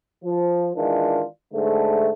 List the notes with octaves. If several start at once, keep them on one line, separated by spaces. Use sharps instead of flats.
F3
D#3 E3 G#3 D4 F4
G#2 D3 A3